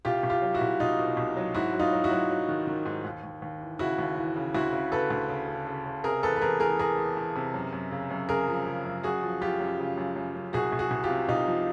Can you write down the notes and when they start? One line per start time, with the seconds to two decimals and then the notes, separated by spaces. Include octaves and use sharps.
0.05 C2 F4 G4
0.23 C2
0.30 F4 G4
0.42 F#3
0.54 E4 F#4
0.61 C2
0.80 C2 D#4 F4
0.99 B2
1.17 C2
1.37 F#3
1.54 G#2 E4 F#4
1.73 F#3
1.79 D#4 F4
1.92 F#3
2.04 E4 F#4
2.11 F#3
2.30 F#3
2.49 D#3
2.67 D#3
2.85 G#2
3.05 D#2
3.24 D#2
3.42 D#2
3.61 E3
3.79 C#3 E4 F#4
3.99 D#2
4.17 E3
4.36 C#3
4.54 D2 E4 F#4
4.72 C#3
4.92 C#3 A4 B4
5.10 D2
5.29 C#3
5.48 C#3
5.67 C#3
5.86 C#3
6.04 C3 G#4 A#4
6.23 E2 A4 B4
6.36 B4
6.42 E2 G#4 A#4
6.60 E2 G#4 A#4
6.79 E2 G#4 A#4
6.98 E2
7.17 E2
7.35 C3
7.54 F#2
7.73 F#2
7.91 C#3
8.10 F#2
8.29 C#3 G#4 A#4
8.48 F3
8.66 C#3
8.85 F#2
9.03 F#2 F#4 G#4
9.23 F3
9.41 F#2 F4 G4
9.60 F#2
9.79 C#3
9.97 F#2
10.16 F#2
10.35 F#2
10.53 C2 F#4 G#4
10.72 C2
10.79 F#4 G#4
10.91 C2
11.04 F4 G4
11.10 C3
11.28 C2 D#4 F4
11.48 F3